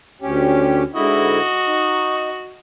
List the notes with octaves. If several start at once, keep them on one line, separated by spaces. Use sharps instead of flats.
D2 C#4 G4
G#2 D3 E4 F#4 D#5
D#4